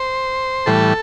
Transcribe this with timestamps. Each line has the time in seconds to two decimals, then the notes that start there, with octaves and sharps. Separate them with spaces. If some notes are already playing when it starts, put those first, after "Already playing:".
Already playing: C5
0.66 A2 E3 G3 A4